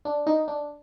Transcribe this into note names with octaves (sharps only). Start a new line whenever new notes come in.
D4
D#4
D4